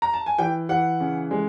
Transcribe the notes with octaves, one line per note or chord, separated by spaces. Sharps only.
A#5
A5
G#5
E3 G5
E3 F#5
C#3
G#3